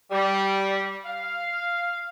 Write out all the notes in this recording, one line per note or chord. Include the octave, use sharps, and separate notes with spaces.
G3
F5